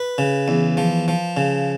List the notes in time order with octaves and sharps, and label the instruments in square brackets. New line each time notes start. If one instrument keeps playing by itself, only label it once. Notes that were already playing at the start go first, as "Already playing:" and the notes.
Already playing: [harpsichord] B4
C#3
E2
F3
F3
C#3